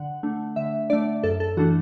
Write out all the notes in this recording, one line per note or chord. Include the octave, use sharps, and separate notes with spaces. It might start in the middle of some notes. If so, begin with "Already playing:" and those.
Already playing: D3 F#5
A3 D4
D3 E5
A3 D4 D5
F#2 A4
A4
E3 A3 D4 F#4